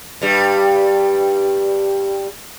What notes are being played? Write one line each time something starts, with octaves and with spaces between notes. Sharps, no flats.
G2 G3